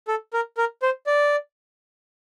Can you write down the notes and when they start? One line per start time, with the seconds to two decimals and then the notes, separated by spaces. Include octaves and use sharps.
0.08 A4
0.33 A#4
0.58 A#4
0.82 C5
1.06 D5